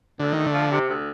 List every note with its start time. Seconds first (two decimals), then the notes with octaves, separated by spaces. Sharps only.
0.20 D2 D3
0.33 D#3 A3
0.46 D3
0.54 F3
0.71 C3
0.89 D2